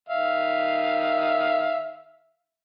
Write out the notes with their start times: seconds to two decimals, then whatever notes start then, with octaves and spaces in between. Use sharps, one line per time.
0.09 D#3 E5 F5